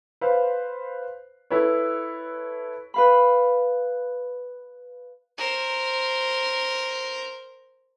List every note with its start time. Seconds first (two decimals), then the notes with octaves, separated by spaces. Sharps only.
0.21 B4 C5 F5
1.50 E4 A4 B4 C#5
2.94 B4 F5 B5
5.38 A#4 C5